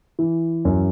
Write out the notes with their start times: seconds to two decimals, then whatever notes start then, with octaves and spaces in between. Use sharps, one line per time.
0.19 E3
0.65 F#2